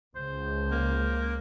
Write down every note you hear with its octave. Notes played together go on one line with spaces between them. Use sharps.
C#2 C5
A#3